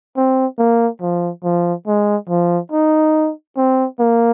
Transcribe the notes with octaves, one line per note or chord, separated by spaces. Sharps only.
C4
A#3
F3
F3
G#3
F3
D#4
C4
A#3